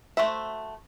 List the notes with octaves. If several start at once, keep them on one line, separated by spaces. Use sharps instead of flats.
A3 F#4 C5 E5